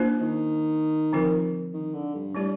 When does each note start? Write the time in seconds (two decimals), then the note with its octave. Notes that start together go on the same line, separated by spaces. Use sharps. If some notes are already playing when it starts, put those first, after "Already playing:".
Already playing: A#3 D4 F4 C5
0.21 D#3
1.13 D3 F3 C4 F4 A#4
1.74 D#3
1.94 D3
2.15 G2
2.35 A2 G3 D4 G4 D5